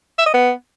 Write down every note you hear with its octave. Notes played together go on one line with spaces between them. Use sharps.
E5
D#5
B3